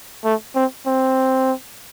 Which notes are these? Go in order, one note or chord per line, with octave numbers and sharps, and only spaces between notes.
A3
C4
C4